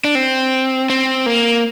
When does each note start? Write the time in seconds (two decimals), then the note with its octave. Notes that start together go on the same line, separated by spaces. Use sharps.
0.04 D4
0.15 C4
0.90 C4
1.26 A#3